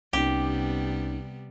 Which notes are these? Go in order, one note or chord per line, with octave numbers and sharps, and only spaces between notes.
C2 C3 G3 B3 C#4 D#4 G4